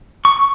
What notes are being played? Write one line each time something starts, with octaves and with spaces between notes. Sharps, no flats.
C#6